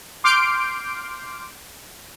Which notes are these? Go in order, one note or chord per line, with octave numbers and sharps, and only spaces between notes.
C6 D6 F6 G6 C7 D7